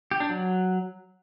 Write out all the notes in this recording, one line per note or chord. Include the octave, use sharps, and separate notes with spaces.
G4
D4
F#3